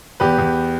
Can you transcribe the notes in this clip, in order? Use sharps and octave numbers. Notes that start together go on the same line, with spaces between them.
E2 G4 B4
E2